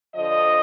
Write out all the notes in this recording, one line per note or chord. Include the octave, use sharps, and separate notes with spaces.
D2 D3 F3 D#5